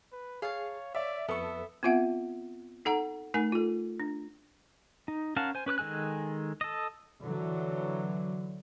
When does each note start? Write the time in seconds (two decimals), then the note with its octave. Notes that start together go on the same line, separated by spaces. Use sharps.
0.12 B4
0.42 G#4 C#5 F5 A5
0.95 C#5 D5 E5
1.29 F2 B3 A4 B4 E5 C#6
1.83 B3 C4 F4 E5 F#5
2.85 D#4 A4 F#5 A#5
3.34 A3 D#4 A#4 G#5
3.52 F4 A4
4.00 D4
5.08 D#4
5.36 C#4 A#4 F5 F#5 A5
5.55 C5 G#5
5.66 C#4 B4 D6 F#6
5.78 D#3 G#3 A4 G#5 F#6
6.61 A4 D#5
7.23 D3 E3 F#3